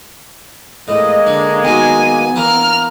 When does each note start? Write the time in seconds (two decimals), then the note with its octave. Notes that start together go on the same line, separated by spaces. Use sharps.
0.88 A2 G#3 A#3 D#5
1.27 D3 D4
1.65 D#3 F#3 B3 G#5
2.36 E3 A#3 A#5 F6